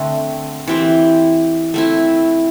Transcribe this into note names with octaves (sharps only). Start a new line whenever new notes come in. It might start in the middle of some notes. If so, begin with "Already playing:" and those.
Already playing: D3 A3 C4 A4
E3 C4 G4
A3 C4 E4